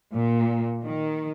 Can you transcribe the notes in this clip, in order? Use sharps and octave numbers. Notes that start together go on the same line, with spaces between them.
A#2
D#3